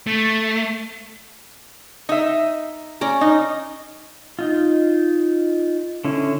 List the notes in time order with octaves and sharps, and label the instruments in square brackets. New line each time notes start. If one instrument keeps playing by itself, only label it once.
[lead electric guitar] A3
[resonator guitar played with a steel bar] D#4 E5
[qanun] C#4 D5 A#5
[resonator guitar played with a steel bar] D#4
[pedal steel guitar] D#4 F4
D3 C#4 E4